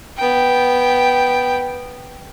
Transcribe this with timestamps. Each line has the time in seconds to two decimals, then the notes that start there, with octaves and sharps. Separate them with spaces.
0.17 B3 G5